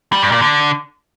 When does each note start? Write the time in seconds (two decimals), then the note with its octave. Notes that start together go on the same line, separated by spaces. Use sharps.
0.13 G3
0.22 G2
0.32 A#2
0.41 D3